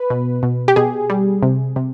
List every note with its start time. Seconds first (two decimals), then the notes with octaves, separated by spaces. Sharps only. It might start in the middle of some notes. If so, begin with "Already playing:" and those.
Already playing: B4
0.10 B2
0.43 B2
0.68 G4
0.76 B2 G#4
1.10 G3
1.43 C3
1.76 C3